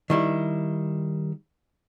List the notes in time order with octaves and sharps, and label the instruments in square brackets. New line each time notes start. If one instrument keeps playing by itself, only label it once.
[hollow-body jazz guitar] D#3 G3 E4